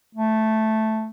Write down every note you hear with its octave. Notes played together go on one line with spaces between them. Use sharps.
A3